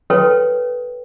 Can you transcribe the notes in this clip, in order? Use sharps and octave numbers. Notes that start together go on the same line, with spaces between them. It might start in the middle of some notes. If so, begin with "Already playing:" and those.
A4 B4 C#5 G5